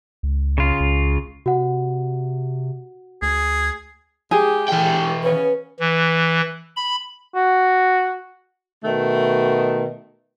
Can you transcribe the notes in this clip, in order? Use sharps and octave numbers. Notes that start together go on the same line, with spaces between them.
C#2
C#3 F4
C#2
C3 F#4 F#5
D2 G#4
G#3 G4 G#4
A2 D3 E3 G4 G5
C#3 B3 C#4 B4
E3
B5
F#4
B2 D#3 A3